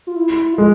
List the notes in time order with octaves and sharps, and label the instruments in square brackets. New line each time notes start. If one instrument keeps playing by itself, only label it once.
[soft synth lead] F4
E4
[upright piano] G#3 [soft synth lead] F4